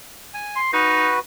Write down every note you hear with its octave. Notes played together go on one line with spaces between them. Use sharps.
G#5
C6
D#4 F#4 B4